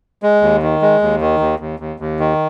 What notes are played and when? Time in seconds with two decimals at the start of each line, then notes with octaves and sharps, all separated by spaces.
0.23 G#3
0.42 D#2
0.62 D#3
0.82 G#3
1.02 D#2
1.21 D#3
1.40 D#2
1.60 D#2
1.80 D#2
2.00 D#2
2.20 D#3